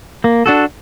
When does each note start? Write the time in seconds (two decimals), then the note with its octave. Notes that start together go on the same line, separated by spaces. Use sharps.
0.24 A#3
0.46 D4 F#4 A4